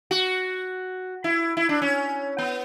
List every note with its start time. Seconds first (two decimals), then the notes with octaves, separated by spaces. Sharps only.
0.11 F#4
1.24 E4
1.57 E4
1.69 D4
1.82 C#4
2.38 B3